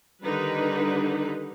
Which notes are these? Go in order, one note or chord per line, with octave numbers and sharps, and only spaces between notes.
D3 D#3 G3 D#4 B4